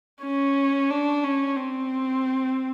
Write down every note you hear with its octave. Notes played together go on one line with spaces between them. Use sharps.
C#4
D4
C#4
C4